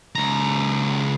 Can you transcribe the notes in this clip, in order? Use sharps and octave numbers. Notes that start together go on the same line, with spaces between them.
C#2 A#5